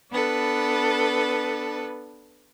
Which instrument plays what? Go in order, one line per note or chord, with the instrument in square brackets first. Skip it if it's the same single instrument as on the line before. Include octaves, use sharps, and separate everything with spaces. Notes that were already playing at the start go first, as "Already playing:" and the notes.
[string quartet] B3 D4 A4 B4